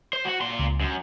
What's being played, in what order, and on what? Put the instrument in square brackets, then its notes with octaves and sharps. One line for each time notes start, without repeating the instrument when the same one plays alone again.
[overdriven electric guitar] C5
F#4 F#5
A#2 C6
[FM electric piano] C#2
[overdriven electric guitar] F#2